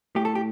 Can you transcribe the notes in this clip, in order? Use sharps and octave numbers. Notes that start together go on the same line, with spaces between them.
A2 A3 G4
A4
G4